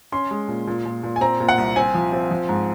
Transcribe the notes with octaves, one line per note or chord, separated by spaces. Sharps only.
C#4 C6
G#3
A#2
A#2
A#2
A#2
G#5
C4 A#5
A#2
F#5
C2
C4 G#5
F3
C4
F3
G#2